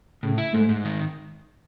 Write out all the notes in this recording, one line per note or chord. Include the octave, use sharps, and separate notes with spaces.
A2 C#3
E4
G#2 A3
G#2
D#3